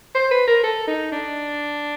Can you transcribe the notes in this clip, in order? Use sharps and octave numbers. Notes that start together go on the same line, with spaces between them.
C5
B4
A#4
A4
D#4
D4